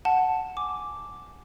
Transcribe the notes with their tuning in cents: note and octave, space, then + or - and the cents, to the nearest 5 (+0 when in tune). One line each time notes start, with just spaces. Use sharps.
F#5 +0 A5 +0
G#5 +0 D6 +0